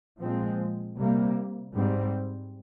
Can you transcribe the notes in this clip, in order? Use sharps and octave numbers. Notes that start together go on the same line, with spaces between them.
A#2 F3 G#3 C4
C3 G3 A#3
G#2 G3 C4